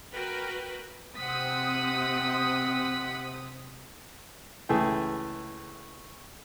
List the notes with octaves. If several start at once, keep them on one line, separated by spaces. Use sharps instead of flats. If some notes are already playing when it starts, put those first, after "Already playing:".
F#4 A#4 B4 G5
C3 C4 F#5 D#6 B6
C#2 E3 A3 G#4 G5